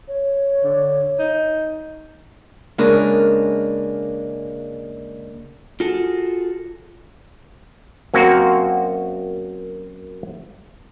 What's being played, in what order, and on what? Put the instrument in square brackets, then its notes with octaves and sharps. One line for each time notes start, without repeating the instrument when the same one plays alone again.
[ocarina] C#5
[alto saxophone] D3
D#4
[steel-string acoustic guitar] C#3 G#3 A#3 D4 G#4 A#4
[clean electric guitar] F4 F#4 G#4 A4
[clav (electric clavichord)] F#2 A#3 C4 F#4 C5